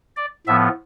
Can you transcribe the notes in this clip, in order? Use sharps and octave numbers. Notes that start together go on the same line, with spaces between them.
D5
A2 F3 B3 E5